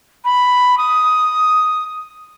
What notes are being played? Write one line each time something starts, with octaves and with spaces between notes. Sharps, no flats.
B5
D#6